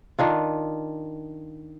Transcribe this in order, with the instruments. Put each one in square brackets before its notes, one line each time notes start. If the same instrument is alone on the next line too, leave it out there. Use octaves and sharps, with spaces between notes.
[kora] D#3 D4 F4